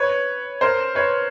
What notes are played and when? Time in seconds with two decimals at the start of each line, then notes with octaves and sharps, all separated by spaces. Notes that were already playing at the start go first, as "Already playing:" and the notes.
Already playing: B4 C#5
0.61 A#4 C5
0.95 B4 C#5